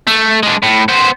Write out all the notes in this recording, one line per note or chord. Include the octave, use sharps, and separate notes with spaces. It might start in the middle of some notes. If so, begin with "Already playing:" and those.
A3
G#3 D4
A2
B3 C5